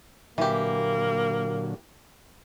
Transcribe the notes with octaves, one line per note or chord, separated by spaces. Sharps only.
A#2 D3 E3 F#3 A#3 G4